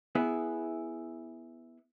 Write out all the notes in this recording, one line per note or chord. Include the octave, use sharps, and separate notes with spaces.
B3 E4 G#4